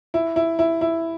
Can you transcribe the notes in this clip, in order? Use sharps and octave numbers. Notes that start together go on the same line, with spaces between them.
E4
E4
E4
E4